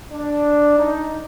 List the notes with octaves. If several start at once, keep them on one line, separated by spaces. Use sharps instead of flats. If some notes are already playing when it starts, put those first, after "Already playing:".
D4
D#4